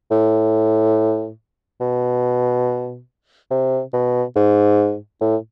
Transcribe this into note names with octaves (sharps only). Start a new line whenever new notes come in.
A2
B2
C3
B2
G#2
A2